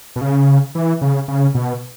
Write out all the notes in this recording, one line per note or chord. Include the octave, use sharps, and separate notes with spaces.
B2
C#3
E3
C#3
C#3
B2